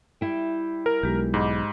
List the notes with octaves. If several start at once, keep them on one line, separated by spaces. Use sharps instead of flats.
G3 E4 G5
A#4
B1 G#3 G4
G#2 D#5 B5 D6